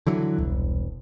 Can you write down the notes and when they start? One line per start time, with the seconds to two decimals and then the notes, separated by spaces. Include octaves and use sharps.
0.07 D3 E3 F#3
0.38 E1 C2